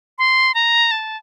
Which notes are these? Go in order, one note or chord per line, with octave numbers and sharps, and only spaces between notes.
C6
A#5
A5